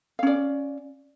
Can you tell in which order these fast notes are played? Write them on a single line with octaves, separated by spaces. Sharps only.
F5 C#4 D5